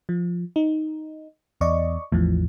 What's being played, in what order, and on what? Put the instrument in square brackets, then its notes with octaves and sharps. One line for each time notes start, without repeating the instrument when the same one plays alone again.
[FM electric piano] F3
D#4
[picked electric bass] E2 [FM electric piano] D5 D#5 C#6
[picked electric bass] A1 E2 A3 [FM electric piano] E3 F3